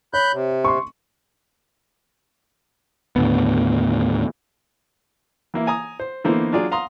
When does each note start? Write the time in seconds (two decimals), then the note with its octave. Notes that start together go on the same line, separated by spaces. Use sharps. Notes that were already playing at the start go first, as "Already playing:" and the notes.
0.14 C#5 B5 F#6 G6
0.33 C3
0.65 C6 C#6
3.16 D#2 A2 D3 B3
5.54 E3 A#3 E4
5.67 G#5 A#5 D#6
6.00 C5
6.24 D3 E3 A#3 B3 D#4 C5
6.53 F#3 D4 F4 G#4 D5
6.72 F5 A#5 C6 D#6